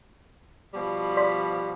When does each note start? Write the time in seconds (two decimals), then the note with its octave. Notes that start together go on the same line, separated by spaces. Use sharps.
0.74 B2 F3 G3
1.17 D5 C6 B6